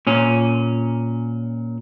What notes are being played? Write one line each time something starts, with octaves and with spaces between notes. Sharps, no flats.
A#2 C#4